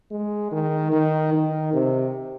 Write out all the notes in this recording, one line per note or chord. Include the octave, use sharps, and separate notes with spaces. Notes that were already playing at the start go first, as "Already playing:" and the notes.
G#3
D#3
D#3
D#3
C3